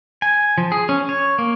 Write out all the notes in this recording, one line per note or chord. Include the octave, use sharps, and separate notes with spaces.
G#5
F3
G#4
C#4
C#5
A#3